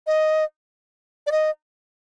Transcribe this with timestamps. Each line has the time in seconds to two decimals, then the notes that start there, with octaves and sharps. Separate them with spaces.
0.07 D#5
1.27 D5
1.32 D#5